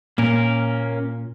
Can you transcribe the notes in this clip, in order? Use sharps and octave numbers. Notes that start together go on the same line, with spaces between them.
A#2 A#3 C#4 A#4